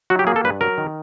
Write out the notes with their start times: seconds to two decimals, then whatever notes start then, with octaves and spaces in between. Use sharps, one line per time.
0.10 F#3 F#4
0.19 G4
0.27 A#3 G#4
0.36 A4
0.44 G2 B4
0.61 F#3 A#4
0.78 D#3